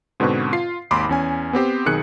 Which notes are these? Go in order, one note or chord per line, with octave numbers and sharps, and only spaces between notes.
G#2 B2 D3 C4 B4 C#6
F4 C7
G#1 D#2 B5 C6 D6
E2 C#4 G#5
B3 C4 G4 C5
B1 D#3 G#4 F#6 C#7